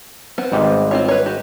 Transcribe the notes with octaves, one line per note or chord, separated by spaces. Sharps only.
B3 C4 F#5
G#1 G#2 G3
C4 F4 C#5
B4 C#5
F#4 G4